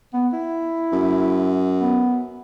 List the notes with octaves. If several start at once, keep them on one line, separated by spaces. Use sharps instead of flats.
B3
E4
F#2
B3